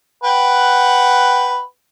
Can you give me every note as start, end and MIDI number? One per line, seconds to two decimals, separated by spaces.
0.24 1.60 71
0.24 1.60 78
0.24 1.60 79